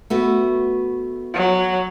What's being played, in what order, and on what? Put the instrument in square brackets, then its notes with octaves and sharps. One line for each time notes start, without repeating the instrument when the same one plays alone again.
[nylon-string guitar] A3 B3 F#4
[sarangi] F#3